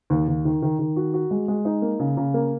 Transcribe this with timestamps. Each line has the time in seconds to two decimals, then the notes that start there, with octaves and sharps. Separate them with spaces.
0.10 D#2
0.28 D#2
0.45 D#3
0.62 D#3
0.79 D#3
0.96 F#4
1.14 F#4
1.31 G#3
1.48 G#3
1.65 D#4
1.82 A#3
1.99 C#3
2.17 C#3
2.34 A#3